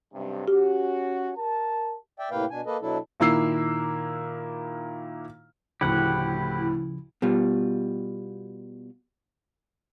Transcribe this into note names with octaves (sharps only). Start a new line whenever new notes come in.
B1 G2 C3
C#4 F#4 G4
A#4 A5
D5 E5 G5
A2 C3 A#3 B4 F5 G5
B2 D4 G#5
A#3 A4 B4 D#5
B2 F#3 D4 E4 A4
A#2 D#3 A#3 E4 E6 C7
D2 A2 C#3 F3 E4 G4 F#5
B2 G3 F4